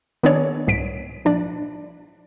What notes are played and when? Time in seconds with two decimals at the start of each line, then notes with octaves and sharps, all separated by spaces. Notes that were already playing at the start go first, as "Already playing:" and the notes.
0.23 D#3 B3 D4 G#4 C#5 D5
0.67 C2 G#2 B6 D7
1.25 A#1 D4 D5